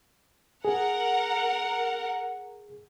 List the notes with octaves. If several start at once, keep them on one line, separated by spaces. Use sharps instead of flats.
G#4 A#4 F#5